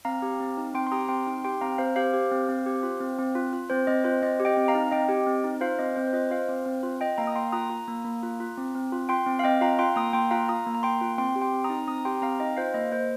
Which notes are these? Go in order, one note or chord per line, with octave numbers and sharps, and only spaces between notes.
C4 F5 A#5
G4
C4
D#4
C4 G5 C6
C6
G4 A#5 D#6
C4 G5 C6
D#4
G4 G5 C6
C4 F5 A#5
C4 C5 F5
G4 C5 F5
G4
C4
C4
G4
F4
C4
C4
F4
F4
C4 C5
C4 D#5
F4 C5
C4 D#5
G4
D#5 G5
C4
F5 A#5
D#4
C4 D#5 G5
G4
C4
D#4
F4 C5 F5
C4 D#5
C4 C5
C5
F4 D#5
F4 C5 F5
C4
C4
F4
F4 D#5 G5
A#3 F5 A#5
D#6
A#3 G5 C6
F4 A#5 D#6
F4
A#3
A#3
F4
F4
C4
C4
F4
F4 G5 C6
C4
F5
C4 D#5 G5
F4 F5 A#5
F4 G5 C6
A#3 A#5 D#6
A#3 G5 C6
F4 F5 A#5
F4 A#5 D#6
A#3
A#5
A#3 G5 C6
F4
C4 G5 C6
G4
G5 C6
C4
A#5 D#6
D#4
C4 A#5 D#6
G4 G5 C6
C4 F5 A#5
D#4 D#5 G5
F4 C5 F5
A#3 D#5
A#3 C5